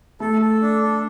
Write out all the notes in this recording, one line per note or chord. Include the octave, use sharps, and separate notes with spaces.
A3 A4
A4
D4
A4